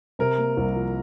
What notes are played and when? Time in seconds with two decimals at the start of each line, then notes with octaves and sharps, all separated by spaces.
0.19 C3 A#4
0.38 A#3
0.57 C2
0.75 F3